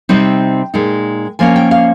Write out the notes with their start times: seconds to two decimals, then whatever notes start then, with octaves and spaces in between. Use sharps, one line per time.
0.09 C3 G3 C4 D#4 G5
0.74 A#2 G#3 D#4
1.39 F3 A#3 C#4 G#5
1.56 G5
1.71 F5